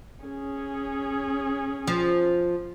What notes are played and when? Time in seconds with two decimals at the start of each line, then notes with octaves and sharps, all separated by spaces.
0.24 C#4 G#4
1.87 F3